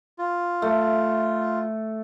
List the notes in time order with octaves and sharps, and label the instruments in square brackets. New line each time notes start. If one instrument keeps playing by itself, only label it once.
[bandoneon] F4
[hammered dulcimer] A3